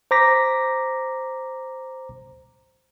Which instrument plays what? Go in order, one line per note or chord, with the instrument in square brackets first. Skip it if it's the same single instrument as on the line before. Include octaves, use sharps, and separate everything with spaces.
[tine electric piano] C5 A#5 D6 A#6 B6